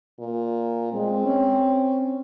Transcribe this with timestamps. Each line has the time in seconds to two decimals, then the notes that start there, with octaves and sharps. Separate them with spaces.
0.20 A#2
0.93 G#3 C4
1.25 C#4